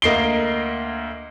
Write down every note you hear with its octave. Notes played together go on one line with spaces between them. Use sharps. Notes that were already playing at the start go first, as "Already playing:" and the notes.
D2 A#3 D#5 C7 D7 G7